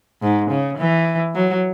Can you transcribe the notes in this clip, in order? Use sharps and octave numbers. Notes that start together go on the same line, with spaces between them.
G#2
C#3
E3
F#3